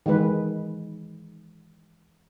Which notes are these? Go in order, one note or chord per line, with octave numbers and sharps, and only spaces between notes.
D#3 E3 G#3 B4